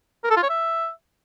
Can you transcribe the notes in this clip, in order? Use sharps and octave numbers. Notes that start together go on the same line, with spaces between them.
A#4
A4
F4
C#5
E5